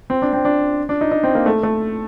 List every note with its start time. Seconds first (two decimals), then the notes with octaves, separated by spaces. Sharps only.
0.10 C4
0.22 D4
0.33 C4
0.45 D4
0.89 D4
1.01 D#4
1.11 D#4
1.23 C4
1.35 A#3
1.46 A3
1.63 A3